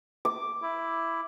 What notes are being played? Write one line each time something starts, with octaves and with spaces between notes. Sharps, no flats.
D6
E4